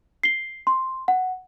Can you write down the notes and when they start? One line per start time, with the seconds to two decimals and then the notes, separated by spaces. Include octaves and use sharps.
0.23 C7 G7
0.67 C6
1.08 F#5